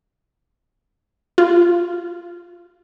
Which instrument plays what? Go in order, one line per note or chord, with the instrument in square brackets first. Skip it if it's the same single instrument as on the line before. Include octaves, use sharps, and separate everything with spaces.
[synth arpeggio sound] F4